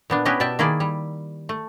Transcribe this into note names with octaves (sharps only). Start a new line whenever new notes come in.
A#2 B3 D4
B3 C#4 E4 G4 B4 D#5
B2 D5 E5 G5 A5
D#3 A#3 E4 G#4 D5
G3
A3